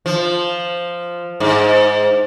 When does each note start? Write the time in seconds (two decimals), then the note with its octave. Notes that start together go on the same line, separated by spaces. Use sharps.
0.06 F3
1.40 G#2